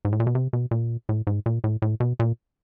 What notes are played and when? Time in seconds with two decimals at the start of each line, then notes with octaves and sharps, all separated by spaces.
0.05 G#2
0.12 A2
0.20 A#2
0.27 B2
0.35 C3
0.53 B2
0.71 A#2
1.09 A2
1.27 G#2
1.46 A#2
1.64 A2
1.82 A2
2.00 B2
2.20 A#2